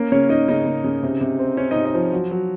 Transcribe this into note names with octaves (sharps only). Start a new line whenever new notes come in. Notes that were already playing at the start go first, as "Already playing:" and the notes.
Already playing: A#3 C#4 A#4
C#3 C#4 C#5
C#3 D#4 D#5
C#3 D#4 D#5
C#3
C#3
C3
C3
C4
C4 C#4 C#5
C3 D#4 D#5
D#4 D#5
F3
F#3
F#3